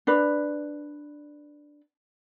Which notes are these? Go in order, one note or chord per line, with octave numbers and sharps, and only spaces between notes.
D4 B4